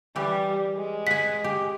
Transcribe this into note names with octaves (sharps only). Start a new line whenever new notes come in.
E3 G3 G4
G#3
F#5 G#5 B6
G4